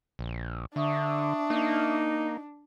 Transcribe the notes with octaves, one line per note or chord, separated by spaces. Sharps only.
A#1
D3 D4 E5 C#6 D#6
A#3 D#4